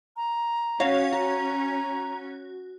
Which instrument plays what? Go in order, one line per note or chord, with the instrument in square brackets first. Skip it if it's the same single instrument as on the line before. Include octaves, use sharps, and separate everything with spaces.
[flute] A#5
[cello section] C#4 [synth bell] F#4 C#5 F5
[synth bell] F#4 [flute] A#5